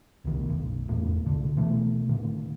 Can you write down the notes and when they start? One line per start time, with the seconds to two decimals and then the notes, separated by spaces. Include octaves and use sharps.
0.25 C2 D#3
0.48 F#1 B1
0.88 F1 E2 A2 A#3
1.26 C2 D3
1.57 B2 E3 A3
2.09 A2 D3 D#3 A#3